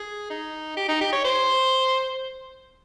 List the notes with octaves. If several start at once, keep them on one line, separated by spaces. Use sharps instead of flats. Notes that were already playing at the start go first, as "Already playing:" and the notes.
Already playing: G#4
D#4
G4
D#4
G4
C#5
C5